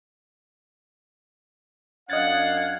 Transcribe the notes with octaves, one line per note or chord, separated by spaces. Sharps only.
F#2 D4 D#5 F5 F#5 F#6 G#6 A6